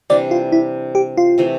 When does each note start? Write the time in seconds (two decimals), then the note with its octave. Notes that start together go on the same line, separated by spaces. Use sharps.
0.10 C3 E3 G3 D4 D5
0.31 F4
0.52 E4
0.95 G4
1.17 F4
1.38 C3 E3 A3